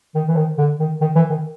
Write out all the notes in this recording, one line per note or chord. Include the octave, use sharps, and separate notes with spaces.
D#3
E3
D#3
D3
D#3
D#3
E3
D#3